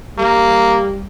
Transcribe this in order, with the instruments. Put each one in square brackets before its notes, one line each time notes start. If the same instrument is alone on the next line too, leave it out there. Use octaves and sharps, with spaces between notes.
[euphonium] G3 [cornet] A#3